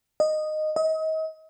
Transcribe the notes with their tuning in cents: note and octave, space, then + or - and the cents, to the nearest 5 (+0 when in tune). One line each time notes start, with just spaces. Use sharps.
D#5 -10
D#5 +35